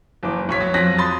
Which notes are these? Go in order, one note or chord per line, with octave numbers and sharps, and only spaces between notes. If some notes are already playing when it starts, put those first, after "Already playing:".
F#1 E3 D6
B1 C#5 B6
F#3
F2 F#3 F#6 A#6 B6
B5 C6 D#6 A6